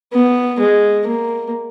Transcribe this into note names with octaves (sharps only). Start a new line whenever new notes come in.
B3
G#3
A#3